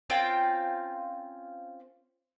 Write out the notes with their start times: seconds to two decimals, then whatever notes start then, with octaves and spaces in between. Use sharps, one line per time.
0.10 C4 C#4 F4 G5